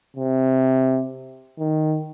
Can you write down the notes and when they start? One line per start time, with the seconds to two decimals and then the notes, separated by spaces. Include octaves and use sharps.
0.17 C3
1.59 D#3